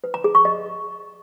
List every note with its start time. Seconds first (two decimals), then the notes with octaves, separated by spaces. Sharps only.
0.04 B4
0.14 A#5
0.24 G#4
0.35 C#6
0.45 D#5